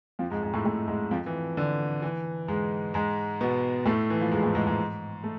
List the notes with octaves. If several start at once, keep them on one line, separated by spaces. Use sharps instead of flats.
F2 F3
G#2 G#3
G#2 G#3
A2 A3
A2 A3
G#2 G#3
F2 F3
E3
D3
E3
G#2 G#3
G#2 G#3
B2 B3
A2 A3
E3
F3
G#2 G#3
A2 A3
G#2 G#3
G#2 G#3
A3